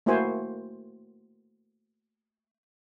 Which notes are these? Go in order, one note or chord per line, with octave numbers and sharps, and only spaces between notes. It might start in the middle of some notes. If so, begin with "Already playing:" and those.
A3 A#3 E4 F#4 C5 G#5